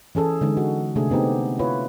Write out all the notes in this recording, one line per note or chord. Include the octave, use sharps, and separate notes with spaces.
E3 C#4 G#4 A4
D3 G#3 D#4
F#4
C3 A3 D4 G#4
A3 B3 C4 D#4 G4
E4 F4 B4 C#5